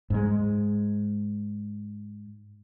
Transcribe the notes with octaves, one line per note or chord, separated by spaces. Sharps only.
G#2 G#3